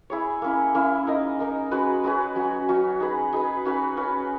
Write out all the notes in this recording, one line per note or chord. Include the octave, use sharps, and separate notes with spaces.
E4 G#4 C#5
A#3 C#4 E4
A#3 C#4 E4
D#4 A#4 D#5
D#4 A#4 D#5
G#3 C#4 F#4 B4
G#3 C#4 F#4 B4
F#3 C#4 F#4
F#3 C#4 F#4
D#4 G#4 B4
D#4 G#4 B4
C#4 F#4 B4
C#4 F#4 B4